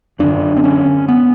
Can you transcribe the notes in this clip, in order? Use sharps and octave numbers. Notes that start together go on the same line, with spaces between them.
F#2 D3 D4
C4
C#4
B3